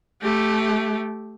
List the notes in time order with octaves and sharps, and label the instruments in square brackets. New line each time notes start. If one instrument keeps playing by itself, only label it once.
[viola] A3 G4